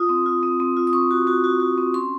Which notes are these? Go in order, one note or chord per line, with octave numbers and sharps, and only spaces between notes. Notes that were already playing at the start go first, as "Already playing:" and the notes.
Already playing: F4 D#6
C4
F4
C4
C4
F4
D#6
C4 C#6
F#4
F#4
F#4
F#4
C4
C#4 C6